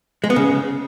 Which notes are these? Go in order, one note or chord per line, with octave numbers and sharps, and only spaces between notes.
G#3
B3
C#3